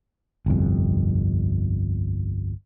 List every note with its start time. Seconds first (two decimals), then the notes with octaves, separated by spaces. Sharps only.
0.46 G1 C2 F2